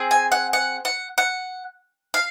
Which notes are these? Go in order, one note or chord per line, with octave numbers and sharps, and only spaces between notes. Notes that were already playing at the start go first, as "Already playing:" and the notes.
Already playing: C4 G#4
G#5
F#5
F#5
F#5
F#5
F5